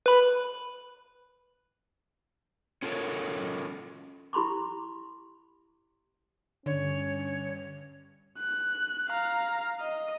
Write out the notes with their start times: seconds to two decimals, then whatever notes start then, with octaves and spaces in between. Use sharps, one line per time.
0.06 B4 B5
2.82 C#4 F4 A4 A#4 C#5
4.33 E4 G4 B5 C6 D6
6.66 G2 D3 C#4 C#5
8.39 F#6
9.09 F5 A#5
9.81 D#5